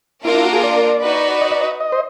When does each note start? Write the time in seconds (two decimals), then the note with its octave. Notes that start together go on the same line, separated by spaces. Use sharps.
0.24 A#3 D4 E4 F4 A#4
0.34 E4
0.44 F#4
0.53 G#4
0.63 D5
1.02 D#4 F#4 B4
1.41 D#5
1.51 D5
1.61 D#5
1.81 D#5
1.92 C5